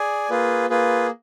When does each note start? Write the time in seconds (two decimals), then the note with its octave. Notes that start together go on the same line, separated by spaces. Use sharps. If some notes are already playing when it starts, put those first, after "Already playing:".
Already playing: G#4 D5 G#5
0.30 A#3 F4 G#4 B4
0.70 A#3 F4 G#4 B4